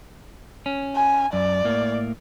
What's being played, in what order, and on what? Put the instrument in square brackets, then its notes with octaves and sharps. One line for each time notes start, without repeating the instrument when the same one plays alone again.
[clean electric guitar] C#4
[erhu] G#5
[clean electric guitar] F#2 [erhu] D5
[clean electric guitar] A2 A#3